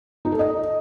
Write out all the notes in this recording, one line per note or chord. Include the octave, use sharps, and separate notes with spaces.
D#4
A4
D#5